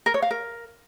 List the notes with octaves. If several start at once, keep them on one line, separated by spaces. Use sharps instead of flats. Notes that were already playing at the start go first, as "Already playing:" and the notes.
A#4
C#5
F5
A#4